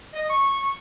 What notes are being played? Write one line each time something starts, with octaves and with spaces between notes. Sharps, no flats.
D#5
C#6